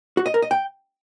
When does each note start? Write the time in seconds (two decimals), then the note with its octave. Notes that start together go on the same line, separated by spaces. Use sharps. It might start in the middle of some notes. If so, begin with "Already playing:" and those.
0.17 F#4
0.26 D#5
0.34 A#4
0.42 D#5
0.51 G5